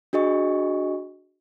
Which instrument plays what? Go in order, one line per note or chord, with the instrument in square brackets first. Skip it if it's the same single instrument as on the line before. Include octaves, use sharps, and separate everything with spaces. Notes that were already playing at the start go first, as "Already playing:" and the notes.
[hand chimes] D4 F#4 G#4 D#5 C#6